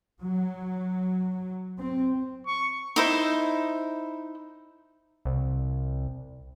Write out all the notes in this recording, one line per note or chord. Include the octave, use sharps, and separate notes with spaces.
F#3
C4
C#6
D#4 E4 C5
C2